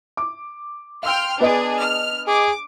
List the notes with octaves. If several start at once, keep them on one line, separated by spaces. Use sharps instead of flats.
D6
F5 G5 C6 E6 F6
B3 D4 G#4 B4 D#5
F6
G#4 D6